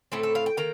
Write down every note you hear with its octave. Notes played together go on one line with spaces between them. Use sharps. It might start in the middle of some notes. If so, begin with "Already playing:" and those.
A2 A3 C4 A4
A4
F5
G5
D#3 A#3 A#5